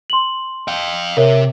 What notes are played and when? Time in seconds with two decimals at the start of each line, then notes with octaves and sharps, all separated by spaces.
0.10 C6 F#7
0.68 F5 G5
1.17 C3 A#4 C#5 E5